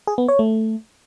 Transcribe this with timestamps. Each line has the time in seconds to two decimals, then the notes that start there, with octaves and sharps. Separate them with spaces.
0.07 G#4
0.18 B3
0.29 C#5
0.39 A3